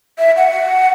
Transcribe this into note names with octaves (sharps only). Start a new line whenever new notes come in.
E5
F#5